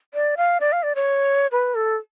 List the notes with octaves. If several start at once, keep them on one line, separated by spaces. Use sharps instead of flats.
D5
F5
D5
F5
D5
C#5
B4
A4